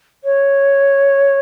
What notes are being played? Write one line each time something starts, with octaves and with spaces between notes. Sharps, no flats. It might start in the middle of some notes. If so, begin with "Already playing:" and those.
C#5